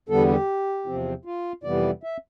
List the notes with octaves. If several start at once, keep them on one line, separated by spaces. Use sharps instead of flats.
E2 D3 G3 B3 A4
G4
E2 C3 F3 C4
F4
F2 C3 E3 G3 B3 D5
E5